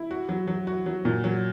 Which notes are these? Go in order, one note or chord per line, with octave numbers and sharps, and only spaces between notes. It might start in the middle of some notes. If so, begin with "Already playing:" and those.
Already playing: E4
F#4
F#3
F#3
F#4
F#3
A#2
F#3